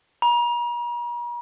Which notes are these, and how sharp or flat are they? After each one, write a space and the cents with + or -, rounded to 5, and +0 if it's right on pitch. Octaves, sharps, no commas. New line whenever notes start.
A#5 +45